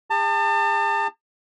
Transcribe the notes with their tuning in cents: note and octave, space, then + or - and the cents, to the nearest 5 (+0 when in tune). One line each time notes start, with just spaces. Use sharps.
G#4 -45 A5 +30